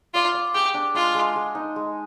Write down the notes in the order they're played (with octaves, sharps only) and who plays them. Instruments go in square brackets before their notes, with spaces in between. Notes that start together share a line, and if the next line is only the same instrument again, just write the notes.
[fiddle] F4 [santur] D5
[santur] D5
[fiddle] G4 [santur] G#4
[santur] D4
[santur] G#3 [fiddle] F4
[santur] G#3
G#3
D#4
G#3